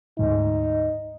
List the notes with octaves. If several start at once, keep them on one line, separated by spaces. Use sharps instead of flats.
D2 G#2 G#3 D#4